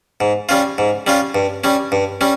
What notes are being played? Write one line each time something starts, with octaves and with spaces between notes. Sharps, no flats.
G#2
G3 C#4 F4
G#2
G3 C#4 F4
G2
G3 C#4
G2
G3 C#4